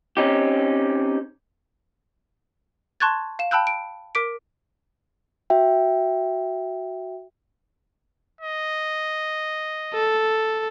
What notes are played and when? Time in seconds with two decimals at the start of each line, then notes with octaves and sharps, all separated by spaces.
0.17 C4 C#4 D#4 G4
3.00 A5 C6 C#6 F#6 G#6 A6
3.39 F5 E7
3.51 G5 A5 B5 E6 F#6 G6
3.67 D7
4.15 A#4 D6 B6 D7
5.50 F#4 E5 G5
8.41 D#5
9.94 A4